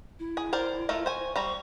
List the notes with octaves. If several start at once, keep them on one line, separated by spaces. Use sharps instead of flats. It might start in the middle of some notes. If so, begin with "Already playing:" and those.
E4
G#4
A#4 C5 D5
A3 F4 A#4
C5 G#5 C#6
G3 C5 A#5 C#6